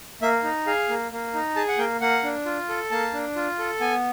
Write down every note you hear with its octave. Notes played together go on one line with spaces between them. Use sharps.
A#3 E5
D#4
G#4 F5
A#3
A#3
D#4
G#4 A5
F#5
A#3 G5
A#3 F#5
D4
F4
A4
A#3 A5
D4
F4
A4
B3 G#5